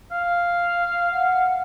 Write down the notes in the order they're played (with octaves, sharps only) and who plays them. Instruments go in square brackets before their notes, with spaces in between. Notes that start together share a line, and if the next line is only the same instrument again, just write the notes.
[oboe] F5
[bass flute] F#5